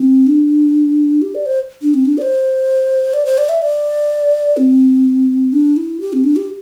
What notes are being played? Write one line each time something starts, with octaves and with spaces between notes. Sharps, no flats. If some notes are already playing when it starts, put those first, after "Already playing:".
Already playing: C4
D4
G4
D5
C5
D4
C4
D4
D5
C5
D5
C5
D5
E5
D5
C4
D4
E4
G4
C4
D4
G4